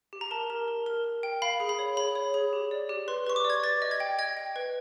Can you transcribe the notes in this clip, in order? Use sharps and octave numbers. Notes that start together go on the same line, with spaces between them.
G4
A#5
A#4 A5
A#4
A#4
A#4
A#4
G5
F5 B5
G#4
B5
C#5
G#4 B5
C#5
G#4
G4
D5
G4
B4 C6
B4 C#6
D6
D5
G#6
B4 A6
D#5
G#6
G5
D#5 G#6
G5
B4